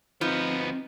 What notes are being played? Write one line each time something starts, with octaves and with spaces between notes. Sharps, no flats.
D2 F3 B3 C4 D#4